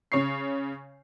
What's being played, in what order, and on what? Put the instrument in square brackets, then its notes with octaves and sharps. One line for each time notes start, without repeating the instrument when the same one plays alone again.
[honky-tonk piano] C#3 C#5 C#6 C7